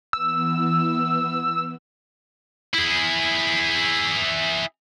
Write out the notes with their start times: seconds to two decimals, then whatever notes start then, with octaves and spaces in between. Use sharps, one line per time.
0.13 E3 B3 E6
2.74 E4 G#4